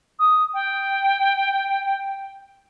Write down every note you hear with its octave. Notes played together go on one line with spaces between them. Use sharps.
D#6
G5